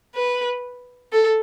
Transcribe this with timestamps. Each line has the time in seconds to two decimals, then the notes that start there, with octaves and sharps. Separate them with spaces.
0.15 B4
1.13 A4